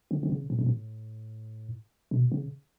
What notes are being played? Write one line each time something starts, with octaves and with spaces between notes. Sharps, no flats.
D3
D3
C#3
A2
B2
A2
B2
C#3